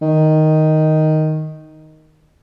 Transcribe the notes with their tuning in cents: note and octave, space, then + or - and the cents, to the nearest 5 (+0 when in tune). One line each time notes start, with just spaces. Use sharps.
D#3 +0